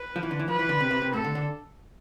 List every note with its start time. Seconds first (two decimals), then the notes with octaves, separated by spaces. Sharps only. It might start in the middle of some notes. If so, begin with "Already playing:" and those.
Already playing: B4
0.16 F3
0.23 E3
0.31 D3
0.39 E3
0.48 F3 B4
0.59 E3
0.69 D3
0.80 C3
0.91 C3
1.02 C3
1.13 A2 A4
1.24 D3
1.35 D3